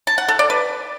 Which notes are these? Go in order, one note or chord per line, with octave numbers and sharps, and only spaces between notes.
A5
F#5
A4
D5
B4